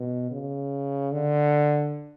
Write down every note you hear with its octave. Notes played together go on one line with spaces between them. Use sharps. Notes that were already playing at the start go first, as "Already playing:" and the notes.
Already playing: B2
C#3
D3